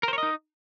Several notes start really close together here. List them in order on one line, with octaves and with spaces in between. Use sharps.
A#4 C5 C#5 D#5 D#4